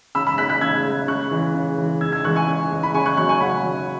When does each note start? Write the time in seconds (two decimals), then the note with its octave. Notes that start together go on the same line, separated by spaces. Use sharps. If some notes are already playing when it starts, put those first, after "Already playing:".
0.15 C#3 B5 E6
0.27 B5 E6
0.38 G#3 F#6 B6
0.49 F#6 B6
0.61 C#3 E6 G#6
0.85 G#3
1.08 C#3 C#6 F#6
1.31 E3 G#3
1.55 C#3
1.78 E3 G#3
2.01 C#3 E6 G#6
2.12 E6 G#6
2.24 E3 G#3 C#6 F#6
2.36 G#5 C#6
2.48 C#3
2.71 E3 G#3
2.83 B5
2.94 C#3 G#5 C#6
3.06 C#6 F#6
3.17 F#3 C#6 F#6
3.29 G#5 C#6
3.41 C#3 F#5 B5
3.64 F#3